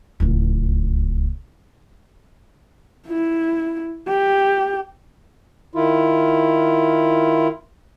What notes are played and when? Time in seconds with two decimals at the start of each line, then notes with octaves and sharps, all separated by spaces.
0.20 D1 C#2
3.08 E4
4.08 G4
5.73 D#3 E4 F4